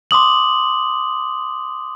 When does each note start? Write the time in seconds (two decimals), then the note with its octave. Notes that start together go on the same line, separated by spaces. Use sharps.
0.11 C6 D6 D#6 F#7